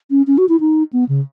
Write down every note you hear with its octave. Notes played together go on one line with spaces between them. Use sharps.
C#4
C#4
F#4
E4
D#4
B3
C#3